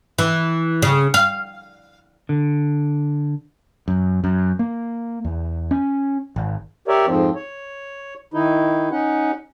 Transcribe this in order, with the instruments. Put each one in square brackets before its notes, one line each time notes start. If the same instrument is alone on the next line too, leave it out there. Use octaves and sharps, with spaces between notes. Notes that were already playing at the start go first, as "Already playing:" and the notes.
[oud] E3
C#3
F5
[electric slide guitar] D3
[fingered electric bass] F#2
F#2
A#3
E2
C#4
G#1
[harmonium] G4 A#4 C#5 D5 E5
F2 G#2 F3 C4
C#5
D#3 D#4 E4
C#4 D#4 F#5